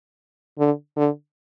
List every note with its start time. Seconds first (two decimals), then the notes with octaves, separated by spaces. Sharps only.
0.59 D3
0.97 D3